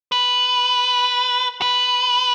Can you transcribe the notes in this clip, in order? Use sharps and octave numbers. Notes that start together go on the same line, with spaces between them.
B4
B4